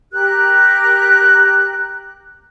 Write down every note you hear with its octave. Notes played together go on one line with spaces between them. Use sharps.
G4 A#4 F#6